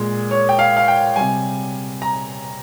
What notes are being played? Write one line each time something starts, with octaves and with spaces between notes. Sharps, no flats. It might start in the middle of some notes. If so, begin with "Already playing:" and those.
Already playing: A#2 G#3
C#5
G5
F5
F5
G5
C3 G3 G#5
A#5